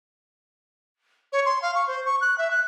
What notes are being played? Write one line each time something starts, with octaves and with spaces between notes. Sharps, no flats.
C#5
C6
F5
C#6
C5
C#6
F#6
E5
F#6